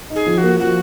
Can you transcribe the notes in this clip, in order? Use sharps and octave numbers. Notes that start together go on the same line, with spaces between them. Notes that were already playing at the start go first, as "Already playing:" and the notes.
D#4
G#4
F3
F#4
A#3
F3 F#4